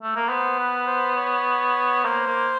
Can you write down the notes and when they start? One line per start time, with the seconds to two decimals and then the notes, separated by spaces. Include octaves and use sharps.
0.03 A3
0.16 A#3
0.29 B3 C5
0.59 B4
0.87 C5
1.17 C#5
2.05 A#3 C5
2.27 A#3